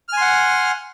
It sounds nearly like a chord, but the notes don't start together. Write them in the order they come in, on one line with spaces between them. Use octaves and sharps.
F6 G#5 C6 F#5